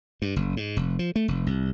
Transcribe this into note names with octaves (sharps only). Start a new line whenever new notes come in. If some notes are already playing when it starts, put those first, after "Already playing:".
G2
F#1
G#2
F1
F3
A3
F1
C2